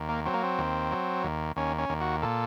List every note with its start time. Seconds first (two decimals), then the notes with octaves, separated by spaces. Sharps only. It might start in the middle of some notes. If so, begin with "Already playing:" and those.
Already playing: D#2
0.09 A#3
0.26 F#3 C4
0.34 A#3
0.43 C4
0.58 D#2
0.92 F#3
1.23 D#2
1.56 D#2 C#4
1.78 C#4
1.89 D#2
2.01 F#4
2.22 A#2 A4